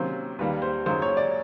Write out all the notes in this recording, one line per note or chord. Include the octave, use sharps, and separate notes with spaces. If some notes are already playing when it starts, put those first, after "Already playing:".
Already playing: C3 D#3 F#3 A#3 C#4 C5
D#2 D#3 G3 A#3 B4
C5
F#2 C#3 F#3 A#3 D#4 C5
C#5
D5